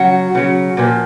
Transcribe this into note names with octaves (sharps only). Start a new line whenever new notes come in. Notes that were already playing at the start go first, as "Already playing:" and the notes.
Already playing: C#3 F#3 F#4
C#3 F#3
A#2 F3